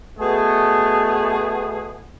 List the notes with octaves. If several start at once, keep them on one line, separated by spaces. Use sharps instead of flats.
B2 A3 B3 G#4